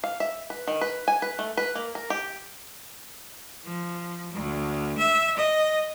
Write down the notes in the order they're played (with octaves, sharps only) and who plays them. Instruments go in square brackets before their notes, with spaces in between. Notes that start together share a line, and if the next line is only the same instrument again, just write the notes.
[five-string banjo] F5
E5
B4
D#3
B4
G#5
B4
A3
B4
A#3
A#4
G4
[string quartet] F3
D2
E5
D#5